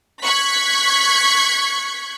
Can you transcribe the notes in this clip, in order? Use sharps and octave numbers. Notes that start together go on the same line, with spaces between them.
C#6 F#6 G#6 B6 C#7